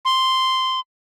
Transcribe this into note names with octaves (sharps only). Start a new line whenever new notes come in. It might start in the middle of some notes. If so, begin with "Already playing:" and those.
C6